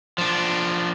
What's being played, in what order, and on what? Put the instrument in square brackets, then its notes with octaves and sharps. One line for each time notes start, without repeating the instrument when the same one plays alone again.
[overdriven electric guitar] F3 D4